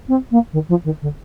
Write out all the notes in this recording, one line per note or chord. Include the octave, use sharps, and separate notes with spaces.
C4
A#3
D#3
F3
D#3
D3